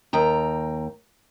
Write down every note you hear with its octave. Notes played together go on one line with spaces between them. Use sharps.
D#2 G5 A#5